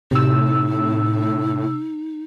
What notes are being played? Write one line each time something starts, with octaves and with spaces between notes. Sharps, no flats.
A2 C3 D#4 E6